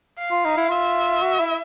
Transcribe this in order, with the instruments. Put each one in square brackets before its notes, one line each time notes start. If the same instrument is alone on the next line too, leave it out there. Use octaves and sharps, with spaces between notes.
[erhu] F5
[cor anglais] F4
D#4
E4
[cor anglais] F4 [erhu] E5
[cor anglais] F#4
E4